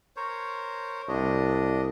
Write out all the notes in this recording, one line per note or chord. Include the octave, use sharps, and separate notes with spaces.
A#4 C5 C#5
C2 D4 D#5